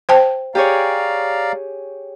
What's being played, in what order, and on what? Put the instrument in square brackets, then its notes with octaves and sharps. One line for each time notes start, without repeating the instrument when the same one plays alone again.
[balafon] C5 G5 A5
[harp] G4 G#4 C#5 [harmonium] D5 F5 A#5